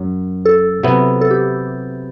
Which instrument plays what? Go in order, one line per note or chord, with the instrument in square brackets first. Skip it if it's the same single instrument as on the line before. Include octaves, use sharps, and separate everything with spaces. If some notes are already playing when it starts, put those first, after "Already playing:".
Already playing: [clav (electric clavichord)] F#2 F#3
[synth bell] A4
[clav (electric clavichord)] C3 F#3 B3 E4
[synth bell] A4
G4